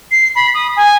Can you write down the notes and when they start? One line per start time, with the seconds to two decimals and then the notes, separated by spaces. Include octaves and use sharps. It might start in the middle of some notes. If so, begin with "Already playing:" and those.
0.11 C7
0.35 B5
0.54 D#6
0.77 G#5